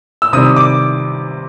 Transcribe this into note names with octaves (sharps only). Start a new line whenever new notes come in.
E6
C3 D#3 G3 D#6
D6